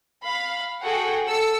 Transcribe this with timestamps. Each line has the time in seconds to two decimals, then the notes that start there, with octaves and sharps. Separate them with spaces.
0.23 F5 B5
0.82 F#4 G#4 A4 F#5 G5
1.25 A4 E6 C#7